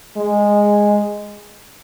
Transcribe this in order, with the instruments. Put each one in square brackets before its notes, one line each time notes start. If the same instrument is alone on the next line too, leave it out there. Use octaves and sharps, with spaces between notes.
[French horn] G#3